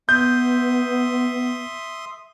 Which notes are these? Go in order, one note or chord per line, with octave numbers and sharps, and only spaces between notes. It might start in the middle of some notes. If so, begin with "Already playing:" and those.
B3 E5 C6 D#6 G6